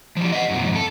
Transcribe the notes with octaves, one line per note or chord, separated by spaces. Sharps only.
F3 G3
D#5 F#5
F#2 B2
F2 G#2
A4